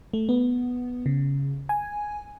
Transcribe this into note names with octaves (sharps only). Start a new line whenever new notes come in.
A3
B3
C#3
G#5